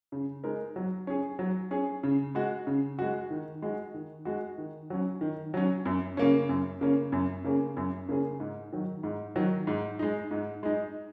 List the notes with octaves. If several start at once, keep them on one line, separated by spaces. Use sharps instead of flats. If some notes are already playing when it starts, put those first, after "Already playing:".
C#3
G#3 D#4 A#4
F#3
C#4 G#4
F#3
C#4 G#4
C#3
G#3 F#4
C#3
G#3 F#4
D#3
G#3 F#4
D#3
G#3 F#4
D#3
F#3 C#4
D#3
F#3 C#4
F#2
C#3 A#3 C#4
F#2
C#3 A#3 C#4
F#2
C#3 A#3 C#4 G#4
F#2
C#3 A#3 C#4 G#4
G#2
D#3 F#3
G#2
D#3 F#3
G#2
G#3 D#4
G#2
G#3 D#4